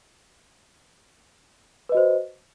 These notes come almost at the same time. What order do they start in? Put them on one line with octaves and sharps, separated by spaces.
B4 D#5 F#4 C5